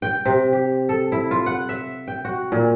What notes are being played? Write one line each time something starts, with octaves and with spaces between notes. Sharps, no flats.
G5
C3
G4
A4
E4
F4
F#5
E5
G5
F#4
A#2